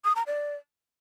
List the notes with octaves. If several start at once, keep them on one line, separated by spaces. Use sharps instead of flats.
D#6
A#5
D5